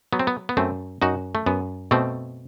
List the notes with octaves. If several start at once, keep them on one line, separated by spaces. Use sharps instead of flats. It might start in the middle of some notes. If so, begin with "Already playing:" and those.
F#3 B3
C4
B3
B3
F#2 A3 C4
F#2 D#4 F#4
A3
F#2 B3
B2 A3 C4